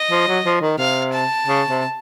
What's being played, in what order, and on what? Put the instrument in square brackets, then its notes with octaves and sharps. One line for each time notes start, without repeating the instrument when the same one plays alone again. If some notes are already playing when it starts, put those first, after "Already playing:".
Already playing: [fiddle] D#5
[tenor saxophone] F3
F#3
F3
D#3
[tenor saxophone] C3 [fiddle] F5
[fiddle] A5
[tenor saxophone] C#3
C3